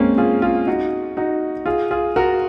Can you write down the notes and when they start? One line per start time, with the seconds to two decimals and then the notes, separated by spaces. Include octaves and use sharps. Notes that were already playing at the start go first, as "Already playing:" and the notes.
Already playing: G#3 A#3 C4 C#4
0.18 F4 G#4
0.42 F4 G#4
0.67 D#4 F#4
1.17 D#4 F#4
1.66 F4 G#4
1.91 F4 G#4
2.16 F#4 A#4